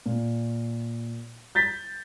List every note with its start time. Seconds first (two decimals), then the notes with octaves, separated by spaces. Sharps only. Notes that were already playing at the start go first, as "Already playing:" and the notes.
0.06 A#2
1.55 G6 A6 B6